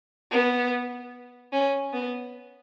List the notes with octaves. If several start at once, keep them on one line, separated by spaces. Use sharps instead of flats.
B3
C#4
B3